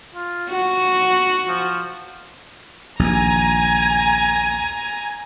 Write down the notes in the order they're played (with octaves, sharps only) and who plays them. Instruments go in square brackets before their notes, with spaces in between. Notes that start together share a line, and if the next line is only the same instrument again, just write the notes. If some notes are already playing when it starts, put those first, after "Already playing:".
[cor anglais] F4
[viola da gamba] F#4 [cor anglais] F#5
[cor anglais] F3
[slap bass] A#1 D#2 [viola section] G#5 A#5